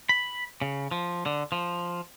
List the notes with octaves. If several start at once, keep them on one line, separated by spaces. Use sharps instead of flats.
B5
C#3
F3
D3
F3